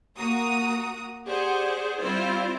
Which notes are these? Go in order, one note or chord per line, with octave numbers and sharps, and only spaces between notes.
A#3 F#4 A#5 D#6
G4 G#4 C5 D5 F#5
G3 C4 E4 F4 C5 D5